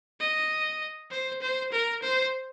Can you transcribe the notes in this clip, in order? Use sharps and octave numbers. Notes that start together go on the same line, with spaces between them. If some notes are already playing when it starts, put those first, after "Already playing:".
D#5
C5
C5
A#4
C5